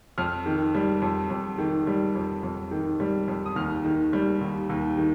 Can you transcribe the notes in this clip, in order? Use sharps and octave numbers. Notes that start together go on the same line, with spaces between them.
F2 F6
D#3
G3
F2
F2
D#3
G3
F2
F2
D#3
G3
F2
D#6
D#2 F6
D#3
G3
D#2
D#2
D#3